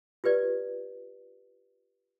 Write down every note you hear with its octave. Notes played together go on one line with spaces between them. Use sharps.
F4 G4 B4 D5